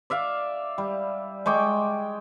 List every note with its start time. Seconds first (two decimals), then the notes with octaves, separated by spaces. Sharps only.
0.10 D5 E5 F5
0.78 G3
1.46 G#3 G5 C#6 D6